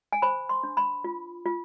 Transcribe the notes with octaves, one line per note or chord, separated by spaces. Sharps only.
G#5
C5 B5
C6
D4
B5
F4
F4